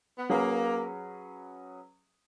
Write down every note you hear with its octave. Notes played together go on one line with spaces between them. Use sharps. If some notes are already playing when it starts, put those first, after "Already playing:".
B3
F#3 A#3 C#4 G#4 B4